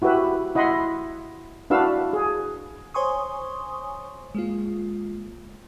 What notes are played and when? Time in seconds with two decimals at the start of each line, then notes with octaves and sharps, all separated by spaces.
0.02 E4 F#4 G4 B4 E5
0.55 E4 D#5 F#5 B5 C6
1.70 D4 E4 F#4 B4 F5 E6
2.13 G#4
2.94 C5 C#5 G#5 C6 C#6 D#6
4.35 G#3 A#3 F4